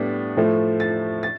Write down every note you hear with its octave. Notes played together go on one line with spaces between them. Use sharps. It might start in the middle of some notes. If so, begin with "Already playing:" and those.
Already playing: A2 G3 B3 D4
A2 F3 A3
A6
A6